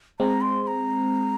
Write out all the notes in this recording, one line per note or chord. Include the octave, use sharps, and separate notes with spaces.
G#3 C4 A#5
C6
C6
A#5